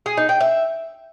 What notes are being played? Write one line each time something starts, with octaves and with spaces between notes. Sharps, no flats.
G#4
D#4
G5
E5